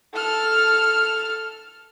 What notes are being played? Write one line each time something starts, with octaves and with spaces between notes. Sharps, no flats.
A4 F6